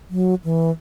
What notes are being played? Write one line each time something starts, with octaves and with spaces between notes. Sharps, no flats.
F#3
E3